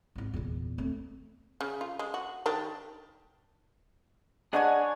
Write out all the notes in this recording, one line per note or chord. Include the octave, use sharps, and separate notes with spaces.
G#1 E4
E2 A#2
A3 C4
C#3
F4
G#3
F#4
D#3 D4 G4
D4 G#4 C#5 D#5 F#5 G#5